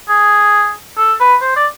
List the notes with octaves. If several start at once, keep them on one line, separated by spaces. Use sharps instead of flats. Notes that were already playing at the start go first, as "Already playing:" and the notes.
G#4
A4
B4
C5
D5